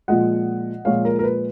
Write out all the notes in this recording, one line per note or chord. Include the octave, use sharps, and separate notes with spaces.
A#2 F3 G#3 D#5 F#5
A#2 F3 G#3 C#5 F5
A#4
A#4
B4